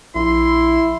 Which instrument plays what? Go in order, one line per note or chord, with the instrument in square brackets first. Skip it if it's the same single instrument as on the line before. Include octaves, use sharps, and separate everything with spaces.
[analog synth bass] A#1 [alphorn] E4 [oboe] C6